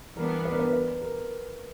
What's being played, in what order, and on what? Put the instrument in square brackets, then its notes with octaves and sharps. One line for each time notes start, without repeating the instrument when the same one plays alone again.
[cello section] E3 G3 B3 D4 [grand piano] A#4
[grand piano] B4
A#4
B4
B4
A#4